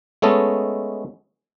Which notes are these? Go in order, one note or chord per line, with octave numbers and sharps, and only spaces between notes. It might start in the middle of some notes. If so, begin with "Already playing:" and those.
G#3 A3 B3 C#4 A4 D#5